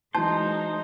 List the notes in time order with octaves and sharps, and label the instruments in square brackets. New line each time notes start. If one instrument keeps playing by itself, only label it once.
[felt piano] E3 F#3 [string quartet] G#3 D#4 [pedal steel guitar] C5 [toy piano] A5